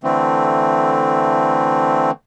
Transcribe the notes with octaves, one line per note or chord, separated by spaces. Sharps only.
D3 E3 A3 C4